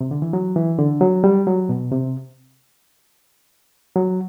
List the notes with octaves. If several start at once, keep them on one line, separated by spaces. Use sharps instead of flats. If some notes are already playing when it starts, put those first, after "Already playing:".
C3
D3
E3
F#3
E3
D3
F#3
G3
F#3
B2
C3
F#3